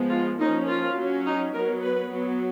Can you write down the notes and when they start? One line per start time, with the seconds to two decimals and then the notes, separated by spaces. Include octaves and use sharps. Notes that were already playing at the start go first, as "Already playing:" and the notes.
Already playing: F3 G#3 B3
0.10 F4
0.39 F3 A#3 C#4 D#4
0.68 F4
0.96 F#3 C#4
1.25 D#4
1.53 F#3 B3 A#4
1.83 B4
2.11 F#3 B3